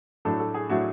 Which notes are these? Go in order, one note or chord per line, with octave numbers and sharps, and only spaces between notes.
A2 F#3 A3 D4 A4
A4
G#4
A2 F#3 A3 D4 F#4